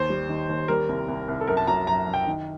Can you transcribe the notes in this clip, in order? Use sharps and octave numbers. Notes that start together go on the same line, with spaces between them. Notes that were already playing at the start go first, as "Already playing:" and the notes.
Already playing: D#2 C5
G3
D#3
D#2
G3 A#4
C2
C2
C2
A4
F#2 A#4
A5
F#3 A#5
F#2 A#5
F#2
G5
D#3